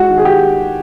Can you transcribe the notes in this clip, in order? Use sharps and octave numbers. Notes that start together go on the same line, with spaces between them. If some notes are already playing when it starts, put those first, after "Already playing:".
Already playing: G#3 F#4
D#3
G#4
G4